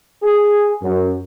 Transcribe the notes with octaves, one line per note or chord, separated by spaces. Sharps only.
G#4
F#2